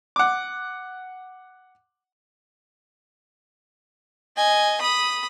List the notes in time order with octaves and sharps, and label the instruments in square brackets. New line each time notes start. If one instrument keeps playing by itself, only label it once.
[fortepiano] F#5 D6
[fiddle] D#5 G#5
B5 D#6